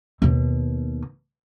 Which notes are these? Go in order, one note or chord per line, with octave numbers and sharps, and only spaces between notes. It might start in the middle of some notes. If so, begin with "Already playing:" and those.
D#2 B2